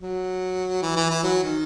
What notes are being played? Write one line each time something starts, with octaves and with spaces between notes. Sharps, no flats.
F#3
E3
E3
E3
F#3
D#3